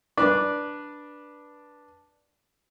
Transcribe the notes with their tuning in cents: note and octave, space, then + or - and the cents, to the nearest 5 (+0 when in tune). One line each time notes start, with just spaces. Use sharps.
D4 +0 B4 -15 D5 +0